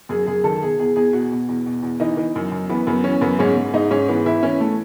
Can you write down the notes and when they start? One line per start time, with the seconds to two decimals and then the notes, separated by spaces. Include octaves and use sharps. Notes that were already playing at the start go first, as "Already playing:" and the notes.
0.09 F#2 G#4
0.26 F#2 G#4
0.44 D#3 A4
0.62 B2 G#4
0.79 E2 G#4
0.96 E2 G#4
1.13 B2 F#4
1.31 B2
1.48 E2
1.66 B2
1.82 E2
2.00 E3 D#4
2.17 E3
2.36 F#2
2.52 F#2
2.69 E3 B3
2.87 F#2 B3
3.04 E3 C#4
3.21 F#2 B3
3.39 G#2 C#4
3.57 G#2
3.74 G#2 D#4
3.91 G#2 C#4
4.09 E3 B3
4.26 E3 E4
4.43 E3 C#4
4.60 A3